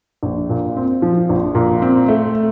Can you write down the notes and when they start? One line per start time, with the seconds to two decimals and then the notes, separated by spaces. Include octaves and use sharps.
0.23 A#1
0.50 A#2
0.77 C4
1.02 F3
1.29 A#1
1.55 A#2
1.82 C4
2.08 A3